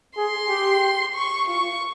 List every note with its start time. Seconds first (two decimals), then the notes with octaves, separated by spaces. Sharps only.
0.17 G#4 C6
0.49 G4
1.15 C#6
1.48 F4 C#6